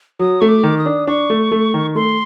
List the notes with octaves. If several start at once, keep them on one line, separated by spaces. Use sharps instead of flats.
F#3 D#6
A3 C#6
D6
D#3
D#6
D4
D4 C#6
A3
A3
D#3
A3 C6